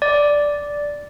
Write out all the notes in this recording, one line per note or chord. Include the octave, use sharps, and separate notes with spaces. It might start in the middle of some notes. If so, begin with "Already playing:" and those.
D5